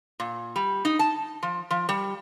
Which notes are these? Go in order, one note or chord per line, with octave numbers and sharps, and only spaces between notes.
A#2
G3
D#4
A5
F3
F3
G3